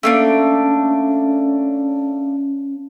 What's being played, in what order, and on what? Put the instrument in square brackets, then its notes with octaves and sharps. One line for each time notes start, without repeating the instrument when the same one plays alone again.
[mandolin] A3 A#3 D4 [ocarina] C#4